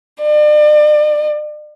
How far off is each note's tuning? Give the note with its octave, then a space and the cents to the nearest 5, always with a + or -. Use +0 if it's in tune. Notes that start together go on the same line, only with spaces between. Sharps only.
D5 +40